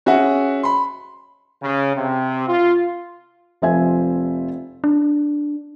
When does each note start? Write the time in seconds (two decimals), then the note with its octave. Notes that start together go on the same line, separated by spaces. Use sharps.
0.06 C#4 F#4 G#4 E5 F#5
0.63 B5 C6
1.63 C#3
1.95 C3
2.47 F4
3.62 F1 F3 C4 E5 G#5 G#6
4.84 D4